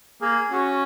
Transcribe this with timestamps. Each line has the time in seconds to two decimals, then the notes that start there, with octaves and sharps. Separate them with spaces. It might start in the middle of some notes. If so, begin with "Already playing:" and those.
0.21 A#3 G#4
0.51 C#4 F#4